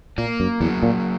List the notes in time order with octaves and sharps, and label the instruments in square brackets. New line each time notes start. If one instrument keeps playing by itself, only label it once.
[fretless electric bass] A#2 [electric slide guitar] A#3
[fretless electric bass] F#2
[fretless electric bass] E2 [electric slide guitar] F#3
[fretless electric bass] A#2